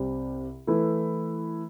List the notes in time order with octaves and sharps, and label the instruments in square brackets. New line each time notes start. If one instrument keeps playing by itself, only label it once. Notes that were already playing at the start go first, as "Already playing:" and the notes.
Already playing: [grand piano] C2 C3 G3 C4
E3 A3 E4 B4